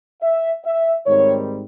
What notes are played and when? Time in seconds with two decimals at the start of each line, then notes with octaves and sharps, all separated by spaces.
0.22 E5
0.64 E5
1.05 G#2 D#3 G3 C4 C#5